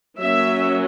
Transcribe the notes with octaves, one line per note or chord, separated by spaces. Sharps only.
F#3 A#3 C#4 E5